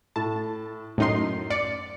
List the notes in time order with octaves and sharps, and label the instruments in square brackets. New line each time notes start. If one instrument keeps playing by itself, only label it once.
[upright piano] A2 [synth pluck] A5
[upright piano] F#2 C7 [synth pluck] A2 D#4 C6
[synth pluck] D5 [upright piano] C#7